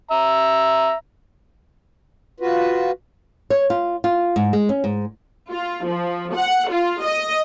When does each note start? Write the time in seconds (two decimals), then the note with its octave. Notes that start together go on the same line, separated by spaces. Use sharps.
0.11 E5 A#5
2.40 F4 F#4 B4
3.50 C#5
3.70 F4
4.04 F4
4.36 G#2
4.53 G#3
4.69 C#4
4.84 G#2
5.50 F4
5.87 F3
6.35 F#5
6.71 F4
7.03 D#5